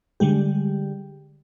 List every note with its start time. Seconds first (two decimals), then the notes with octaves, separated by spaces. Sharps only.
0.20 D3 G3 G#3 G4